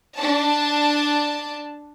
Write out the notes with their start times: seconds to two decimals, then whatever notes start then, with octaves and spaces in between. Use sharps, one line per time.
0.16 D4 A5